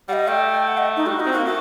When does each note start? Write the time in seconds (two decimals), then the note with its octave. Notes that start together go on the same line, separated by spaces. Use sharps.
0.08 G3 D#5 F#5
0.28 A3 G5
0.68 F#5
0.78 D#5
0.97 D#4
1.06 G3 F#4
1.20 D#4
1.26 C4
1.33 A#3 F#4
1.45 A3 F#4